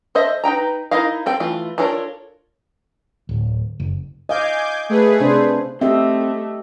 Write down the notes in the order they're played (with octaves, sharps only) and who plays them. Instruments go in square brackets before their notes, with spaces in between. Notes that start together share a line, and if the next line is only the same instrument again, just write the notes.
[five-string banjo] A4 C5 D#5 E5
D#4 B4 G5 A#5
D#4 E4 A#4 D#5 F5
C4 A4 G5
E3 A3 F4
D4 F4 A4 A#4 C#5
[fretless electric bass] D1
F#1
[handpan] D#5 F5 [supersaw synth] G#5 D6 G6
[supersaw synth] A3 G#4 B4
[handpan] C3 D4 C5
[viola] A3 [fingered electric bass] C4 [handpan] G4 D#5 E5